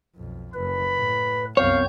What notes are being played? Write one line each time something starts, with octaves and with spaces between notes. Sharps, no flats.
B1 F2
F#1 B4 B5
A2
C2 F#2 B3 C4 C#5 F5 G6